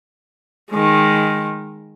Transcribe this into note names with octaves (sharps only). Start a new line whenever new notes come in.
D#3 G#3